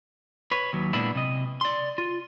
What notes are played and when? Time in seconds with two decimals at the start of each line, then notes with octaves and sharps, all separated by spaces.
0.51 B4 C#5
0.73 D#2 F#3
0.93 A#2 G#3 A#3 B3 D4 E4
1.15 C3 D#5
1.61 D5 C6
1.98 F4